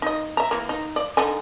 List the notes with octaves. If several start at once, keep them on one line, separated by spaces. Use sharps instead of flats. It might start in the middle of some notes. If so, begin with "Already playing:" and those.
D#4 D#5
E5 A#5
E3 A#3
D#4
D5
D3 D#4 G#5